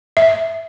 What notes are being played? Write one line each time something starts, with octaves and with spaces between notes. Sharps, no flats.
E5